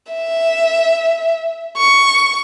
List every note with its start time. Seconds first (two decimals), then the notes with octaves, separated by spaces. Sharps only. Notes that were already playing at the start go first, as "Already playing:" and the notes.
0.12 E5
1.77 C#6